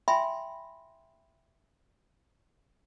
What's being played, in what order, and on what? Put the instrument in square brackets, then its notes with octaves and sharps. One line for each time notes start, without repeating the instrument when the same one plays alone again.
[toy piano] E5 G5 G#5 B5 C6